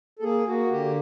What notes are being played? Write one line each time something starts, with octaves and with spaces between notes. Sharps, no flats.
A4
A#3 G#4
A#3 F#4
D3 G4